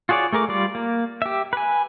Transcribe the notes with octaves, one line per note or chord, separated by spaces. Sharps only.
F4 F#4 G#4 C#5 D5
A3 G#4 A#4 D6
G3 F4 D5
A#3
G4 E5
B4 G#5